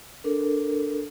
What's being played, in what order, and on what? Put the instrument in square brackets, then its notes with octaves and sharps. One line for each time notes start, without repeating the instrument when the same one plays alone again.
[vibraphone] D4 A4 A#4